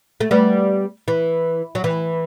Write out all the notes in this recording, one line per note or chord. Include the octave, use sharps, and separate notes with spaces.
A3
G3 B3
E3
F#3
E3